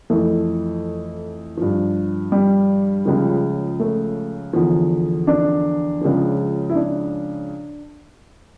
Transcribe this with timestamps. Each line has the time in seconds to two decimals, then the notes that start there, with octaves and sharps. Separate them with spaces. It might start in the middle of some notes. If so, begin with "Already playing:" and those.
0.10 F2 E3 A3
1.57 G2 F3
2.32 G3
3.05 C#2 C#3 F3
3.79 A3
4.53 E2 D3 F3
5.27 D4
6.01 C#2 C#3 F3
6.70 E4
6.75 D4